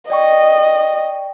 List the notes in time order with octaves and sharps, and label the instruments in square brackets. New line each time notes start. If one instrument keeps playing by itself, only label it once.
[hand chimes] D5 G5 C#6 [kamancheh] D#5